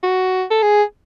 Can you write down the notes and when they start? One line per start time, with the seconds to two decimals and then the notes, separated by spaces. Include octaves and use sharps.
0.03 F#4
0.51 A4
0.62 G#4